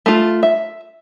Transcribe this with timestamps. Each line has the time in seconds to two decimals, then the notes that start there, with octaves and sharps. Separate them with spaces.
0.06 A3 F4
0.43 E5